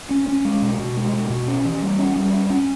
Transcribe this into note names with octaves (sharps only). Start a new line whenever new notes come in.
C#4
C#4
G#3
B2
B2
G#3
B2
B2
C#4
E3
G3
C#4
G3
C#4
C#4